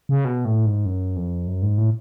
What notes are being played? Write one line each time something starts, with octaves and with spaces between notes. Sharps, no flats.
C#3
B2
A2
G#2
F#2
F2
F#2
G#2
A2